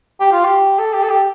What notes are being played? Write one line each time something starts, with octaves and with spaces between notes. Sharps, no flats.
G4
F4
G4
A4
G4
A4
G4